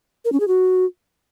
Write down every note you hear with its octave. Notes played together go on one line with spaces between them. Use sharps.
A#4
C#4
G#4
F#4